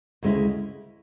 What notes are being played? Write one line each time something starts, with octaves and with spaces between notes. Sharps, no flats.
D2 C#3 G#3 C#4 E4